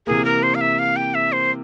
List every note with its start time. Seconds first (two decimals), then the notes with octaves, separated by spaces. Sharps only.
0.07 C3 E3 A#3 G#4
0.25 A#4
0.43 C5
0.55 F5
0.61 E5
0.79 F5
0.96 G5
1.15 E5
1.32 C5